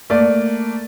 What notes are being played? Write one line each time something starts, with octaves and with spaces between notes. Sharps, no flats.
A3 A#3 D5